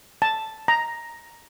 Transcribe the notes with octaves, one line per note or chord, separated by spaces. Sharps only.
A5
A#5